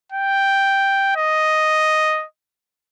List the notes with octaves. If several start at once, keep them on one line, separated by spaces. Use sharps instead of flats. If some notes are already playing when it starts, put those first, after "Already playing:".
G5
D#5